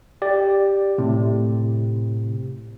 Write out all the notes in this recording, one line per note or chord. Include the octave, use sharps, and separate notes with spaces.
G4 D5
A2 C3